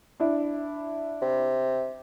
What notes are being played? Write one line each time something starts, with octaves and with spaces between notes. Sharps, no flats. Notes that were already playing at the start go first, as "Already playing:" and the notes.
D4 E4
C3